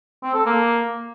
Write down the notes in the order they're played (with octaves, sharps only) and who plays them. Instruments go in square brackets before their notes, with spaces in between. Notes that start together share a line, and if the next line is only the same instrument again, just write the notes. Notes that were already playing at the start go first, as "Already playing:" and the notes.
[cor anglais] C4
A4
A#3